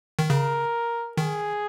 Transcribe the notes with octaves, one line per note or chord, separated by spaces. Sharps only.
D#3
C#3 A#4
D#3 G#4